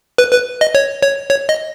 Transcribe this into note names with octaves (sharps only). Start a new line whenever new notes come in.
B4
B4
D#5
C#5
C#5
C#5
D#5